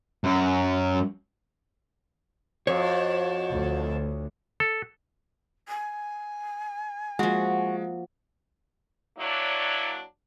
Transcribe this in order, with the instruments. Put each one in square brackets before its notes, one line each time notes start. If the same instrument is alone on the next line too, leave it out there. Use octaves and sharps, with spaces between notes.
[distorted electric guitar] F#2
[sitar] F2 [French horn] F#4 [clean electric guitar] C#5
[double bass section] D2
[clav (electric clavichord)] A4
[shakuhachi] G#5
[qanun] F3 A#3 [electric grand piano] G#3 [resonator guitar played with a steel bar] F#4
[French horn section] F#3 A#3 D4 E4 C#5 D5